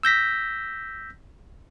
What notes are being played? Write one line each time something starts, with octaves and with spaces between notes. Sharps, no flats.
E6 G6 A#6 B6